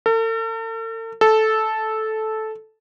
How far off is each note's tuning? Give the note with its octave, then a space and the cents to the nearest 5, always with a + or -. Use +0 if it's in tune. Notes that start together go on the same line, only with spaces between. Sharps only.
A4 +45
A4 -10